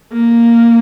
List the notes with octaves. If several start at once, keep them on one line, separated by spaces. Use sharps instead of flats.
A#3